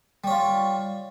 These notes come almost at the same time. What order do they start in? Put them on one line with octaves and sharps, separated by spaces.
G3 C#5 F4